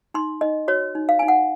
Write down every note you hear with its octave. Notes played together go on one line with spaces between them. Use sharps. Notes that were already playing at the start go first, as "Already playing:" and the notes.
D#4 C6
D#4 D#5
F#4 C#5
D#4
F5
D#4 G#5
F#5